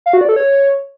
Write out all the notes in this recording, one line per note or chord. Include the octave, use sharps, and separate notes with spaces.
F5
F#4
D5
A4
C#5